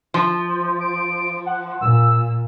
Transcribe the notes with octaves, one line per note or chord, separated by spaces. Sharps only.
F3
D7
F#5
A#2 E6